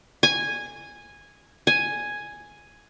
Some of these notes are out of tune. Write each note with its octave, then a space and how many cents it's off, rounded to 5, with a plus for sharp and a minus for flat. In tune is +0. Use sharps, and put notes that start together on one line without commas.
G#5 -10
G#5 +0